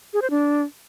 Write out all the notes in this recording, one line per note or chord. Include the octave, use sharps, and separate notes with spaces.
G#4
C5
D4